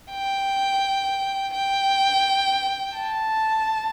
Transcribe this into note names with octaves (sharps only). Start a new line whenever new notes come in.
G5
G5
A5